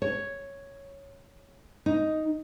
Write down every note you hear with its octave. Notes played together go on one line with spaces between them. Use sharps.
C#5
D#4